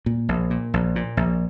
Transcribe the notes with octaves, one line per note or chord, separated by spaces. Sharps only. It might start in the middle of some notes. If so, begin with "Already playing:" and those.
A#2
A#1
A#2
A#1
A#2
A#1